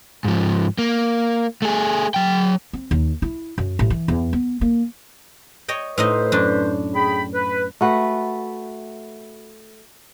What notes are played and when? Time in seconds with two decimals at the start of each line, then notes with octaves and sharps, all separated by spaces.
0.25 G#2 F3
0.78 A#3
1.62 A3 G#4
2.14 F#3 G5
2.73 C4
2.91 D#2
3.22 E4
3.58 F#2
3.79 A1
3.90 E3
4.08 E2
4.33 B3
4.61 A#3
5.68 C#5 D#5 G5
5.98 A2 D#4 B4 C5 D#5
6.32 F#2 D4
6.95 G#4 G5 B5
7.34 B4
7.81 A3 F#4 B4